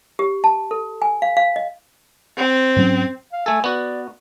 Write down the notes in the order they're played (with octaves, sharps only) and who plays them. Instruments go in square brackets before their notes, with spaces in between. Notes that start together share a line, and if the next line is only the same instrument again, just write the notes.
[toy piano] G4
A5
A4
G#5
F5
F5
D#5
[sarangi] C4
[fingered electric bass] G#2 F#3 C#4
[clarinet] F5
[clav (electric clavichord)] A3 A4 [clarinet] G#5
[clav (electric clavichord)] B3 F#4 [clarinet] D5